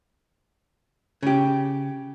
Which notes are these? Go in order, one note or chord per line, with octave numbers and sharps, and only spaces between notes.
C#3 G4